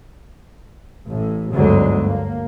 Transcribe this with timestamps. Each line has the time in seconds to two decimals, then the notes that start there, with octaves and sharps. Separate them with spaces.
1.08 A1 A2
1.53 G1 D2 G#2 D3 F#3 G#3
2.05 A#3